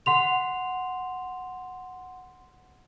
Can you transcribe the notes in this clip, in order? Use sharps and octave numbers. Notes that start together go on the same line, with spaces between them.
F#5 C6 F7